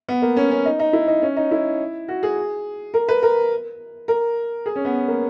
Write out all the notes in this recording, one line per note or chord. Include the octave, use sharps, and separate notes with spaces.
B3
A#3
C#4
C#4
D#4
D#4
E4
D#4
C#4
D#4
E4
F#4
G#4
A#4
B4
A#4
A#4
G#4
C#4
B3
A#3